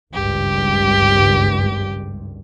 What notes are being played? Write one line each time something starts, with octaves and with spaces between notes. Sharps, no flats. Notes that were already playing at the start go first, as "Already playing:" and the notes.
G#1 C#2 G2 G4